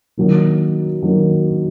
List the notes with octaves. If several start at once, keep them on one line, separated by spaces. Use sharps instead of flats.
D#3 F#3 A#3
D#3 F#3 A#3